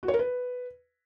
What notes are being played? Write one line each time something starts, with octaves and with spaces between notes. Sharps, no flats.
F#4
C#5
A#4
B4